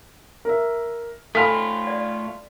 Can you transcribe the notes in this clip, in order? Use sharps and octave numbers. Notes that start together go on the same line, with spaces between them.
A#4 E5
A3 F4 A4 G#5 A#5 B5 F6 B6
D5